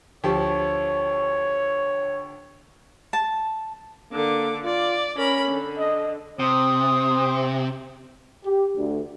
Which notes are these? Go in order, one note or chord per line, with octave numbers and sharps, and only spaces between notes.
D2 F3 G4 C#5
A5
D3 A#3 D6
F4 D5
C#4 A#4 B5
D3
D#5
C3 C5 D#6
G4
D2